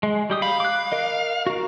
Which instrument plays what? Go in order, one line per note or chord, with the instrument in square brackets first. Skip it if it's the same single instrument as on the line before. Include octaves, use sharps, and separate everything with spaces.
[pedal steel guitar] G#3
G3 G4 D#6
[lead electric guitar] F5 [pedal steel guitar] B5
[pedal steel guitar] D6 F#6
A#4 D#5
F#4 A#4